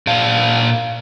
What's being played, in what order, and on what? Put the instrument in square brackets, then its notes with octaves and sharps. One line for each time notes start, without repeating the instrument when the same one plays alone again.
[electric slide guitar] A#2 D5 F5 A5